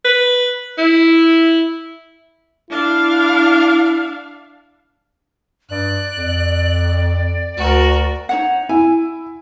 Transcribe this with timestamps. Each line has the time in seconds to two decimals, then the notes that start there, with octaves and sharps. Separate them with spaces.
0.05 B4
0.78 E4
2.70 D4 E4 F5
5.71 G2 D5 F#6
6.16 F2
7.57 D2 F#4 A#4
8.29 D#4 C#5 F#5
8.69 E4 G#5